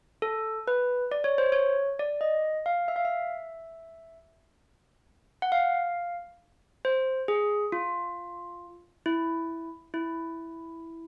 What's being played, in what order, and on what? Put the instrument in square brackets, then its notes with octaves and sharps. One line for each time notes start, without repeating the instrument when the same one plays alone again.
[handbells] A4
B4
D5
C#5
C5
C#5
D5
D#5
F5
E5
F5
E5
F#5
F5
C5
G#4
F4
E4
E4